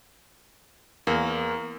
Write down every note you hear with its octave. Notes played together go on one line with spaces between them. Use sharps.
E2 A#3